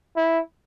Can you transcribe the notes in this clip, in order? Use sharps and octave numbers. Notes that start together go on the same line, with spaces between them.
E4